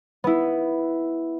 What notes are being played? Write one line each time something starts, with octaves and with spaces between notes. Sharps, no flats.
B3 E4